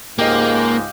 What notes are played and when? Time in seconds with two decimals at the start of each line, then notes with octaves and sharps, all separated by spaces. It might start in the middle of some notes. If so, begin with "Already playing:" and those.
0.19 C#2 G#2 A#3 G4 D#5 F5